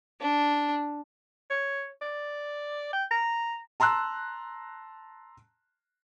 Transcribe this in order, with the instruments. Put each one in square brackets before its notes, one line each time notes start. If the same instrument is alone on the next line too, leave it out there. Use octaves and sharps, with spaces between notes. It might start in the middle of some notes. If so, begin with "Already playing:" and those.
[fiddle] D4
[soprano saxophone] C#5
D5
G5
A#5
[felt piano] A5 A#5 C6 E6 F#6